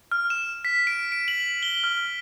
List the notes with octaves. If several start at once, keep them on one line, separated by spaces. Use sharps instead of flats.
F6
E7
B6
D7
D7
F#7
G7
F6